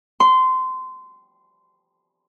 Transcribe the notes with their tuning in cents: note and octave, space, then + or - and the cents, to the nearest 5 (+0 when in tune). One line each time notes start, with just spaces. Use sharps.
C6 -20